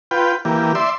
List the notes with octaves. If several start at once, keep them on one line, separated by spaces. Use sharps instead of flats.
F4 B4 G5
E3 A#3 G4
D5 E5 C6